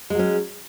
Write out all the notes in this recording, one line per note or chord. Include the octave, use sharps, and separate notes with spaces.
F#3 G#3 C#4